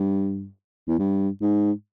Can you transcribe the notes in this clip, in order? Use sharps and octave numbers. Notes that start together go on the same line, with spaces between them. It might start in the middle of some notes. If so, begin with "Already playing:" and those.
Already playing: G2
E2
G2
G#2